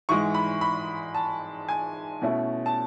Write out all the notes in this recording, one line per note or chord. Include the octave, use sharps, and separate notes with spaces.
G#2 E3 G#3 C#6
B5
B5
A5
G#5
B2 A3 C#4 E4
A5